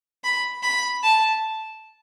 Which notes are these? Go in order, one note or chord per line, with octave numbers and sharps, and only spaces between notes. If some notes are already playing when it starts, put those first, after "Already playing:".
B5
B5
A5